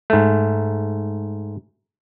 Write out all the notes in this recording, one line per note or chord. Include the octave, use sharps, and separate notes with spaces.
G#2 A3